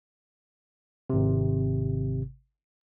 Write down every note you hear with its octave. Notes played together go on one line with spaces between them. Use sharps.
G#1 C3